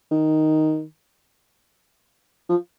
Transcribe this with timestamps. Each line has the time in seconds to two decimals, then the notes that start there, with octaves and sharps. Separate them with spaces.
0.11 D#3
2.49 F3